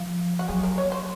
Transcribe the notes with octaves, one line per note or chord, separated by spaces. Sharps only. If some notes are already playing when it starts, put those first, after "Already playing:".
Already playing: F3 F4
F#4
F#3 G#4
A#4
C#5
C5